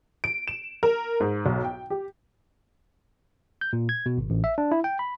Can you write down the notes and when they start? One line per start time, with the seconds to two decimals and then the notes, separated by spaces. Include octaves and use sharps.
0.24 D7
0.48 E7
0.83 A#4
1.20 G#2
1.46 B1
1.64 G5
1.90 G4
3.61 G6
3.73 A#2
3.89 G#6
4.06 B2
4.18 G#1
4.30 A1
4.44 E5
4.58 D4
4.72 E4
4.84 G5
4.99 B5